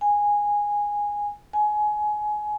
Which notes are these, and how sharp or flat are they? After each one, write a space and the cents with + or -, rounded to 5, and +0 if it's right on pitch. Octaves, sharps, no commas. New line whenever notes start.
G#5 -10
G#5 +20